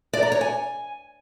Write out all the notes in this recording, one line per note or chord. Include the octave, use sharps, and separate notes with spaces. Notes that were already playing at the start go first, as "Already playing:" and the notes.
D5
A#5
C#5
G#5